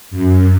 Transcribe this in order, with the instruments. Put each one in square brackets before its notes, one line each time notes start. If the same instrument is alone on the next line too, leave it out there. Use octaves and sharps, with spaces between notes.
[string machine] F#2